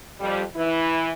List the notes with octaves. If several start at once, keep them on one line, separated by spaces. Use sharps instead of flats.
F2 G3
E3 E4